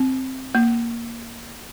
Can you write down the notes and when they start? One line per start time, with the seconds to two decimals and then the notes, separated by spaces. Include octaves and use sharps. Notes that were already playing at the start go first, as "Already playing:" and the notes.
Already playing: C4
0.55 A#3